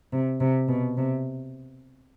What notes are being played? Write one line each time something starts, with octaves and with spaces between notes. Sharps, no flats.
C3
C3
B2
C3